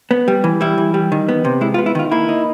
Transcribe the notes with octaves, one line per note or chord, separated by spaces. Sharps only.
B3
G3
E3
G3 E4
E3
G3
D#3
B3
C3
G#3 E4
F4
B3
E4
D#3 F4
A#3 E4
D#4